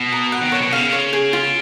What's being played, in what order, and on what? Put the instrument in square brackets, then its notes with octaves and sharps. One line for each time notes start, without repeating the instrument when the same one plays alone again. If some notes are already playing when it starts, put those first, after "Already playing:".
Already playing: [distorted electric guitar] B2
[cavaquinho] A#5
F#5
[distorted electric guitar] D#3
[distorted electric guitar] B2 [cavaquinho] C#5
[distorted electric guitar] B2
[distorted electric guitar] C#3 [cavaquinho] F5
[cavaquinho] C#5
G#4
F4